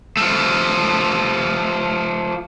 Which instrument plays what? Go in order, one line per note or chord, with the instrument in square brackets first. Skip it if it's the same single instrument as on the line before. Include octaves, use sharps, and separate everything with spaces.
[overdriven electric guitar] F3 A3